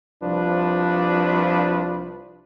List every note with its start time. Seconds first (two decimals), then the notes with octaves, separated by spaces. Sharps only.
0.22 C2 F3 D4 F4 B4